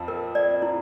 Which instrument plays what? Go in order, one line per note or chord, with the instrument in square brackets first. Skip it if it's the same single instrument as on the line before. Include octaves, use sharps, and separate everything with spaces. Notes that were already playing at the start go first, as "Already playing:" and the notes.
Already playing: [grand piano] F2 F3
[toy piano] A#4
D5
E4